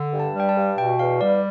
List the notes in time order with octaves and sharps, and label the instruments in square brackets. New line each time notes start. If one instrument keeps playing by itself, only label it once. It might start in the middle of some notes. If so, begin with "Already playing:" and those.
Already playing: [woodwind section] D3
G2
[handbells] A5
[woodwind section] G3
[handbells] G5
A5
[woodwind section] G2
[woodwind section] B2 [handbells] G5
[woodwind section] E2 [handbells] F5
[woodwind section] G3 [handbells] D5